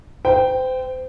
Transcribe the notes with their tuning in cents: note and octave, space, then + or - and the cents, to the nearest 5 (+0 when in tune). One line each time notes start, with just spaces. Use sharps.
C5 -30 G5 +0